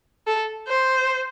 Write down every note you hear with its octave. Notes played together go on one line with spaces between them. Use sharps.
A4
C5